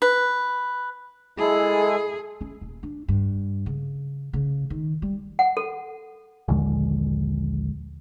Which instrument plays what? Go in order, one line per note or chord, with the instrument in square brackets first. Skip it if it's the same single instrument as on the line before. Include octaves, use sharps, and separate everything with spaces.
[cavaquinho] B4
[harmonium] G#3 E4 A4 [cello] G#4
[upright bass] C#4
D#1
D4
G2
C#3
C#3
D#3
G3
[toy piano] F#5
A4
[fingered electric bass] A#1 D#2 D3 G#3